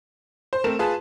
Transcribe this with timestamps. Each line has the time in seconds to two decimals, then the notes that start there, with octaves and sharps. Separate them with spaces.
0.53 C5
0.64 A3 C4 A#4 E7
0.79 F4 G#4 B4 A5